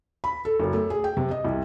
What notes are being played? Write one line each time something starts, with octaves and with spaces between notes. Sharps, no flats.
B5
A4
F#1
A3
G#4
G5
C3
D#5
C2